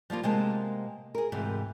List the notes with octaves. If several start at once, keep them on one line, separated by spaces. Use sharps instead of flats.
F3 G3 A#3 F4
C3 G#3 A#3 B3 C5 A5
G#4 A#4
D2 G#2 C3 E3